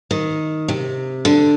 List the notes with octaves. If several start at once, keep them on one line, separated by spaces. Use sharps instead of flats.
D#3
C3
D3